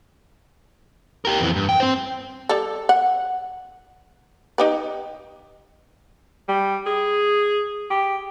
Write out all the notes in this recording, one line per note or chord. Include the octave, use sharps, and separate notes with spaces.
G4 A#4
F2 E3
G2
G5
C4 C5
G3 A4
F#5
D#4 G4 B4
G3
G#4
G4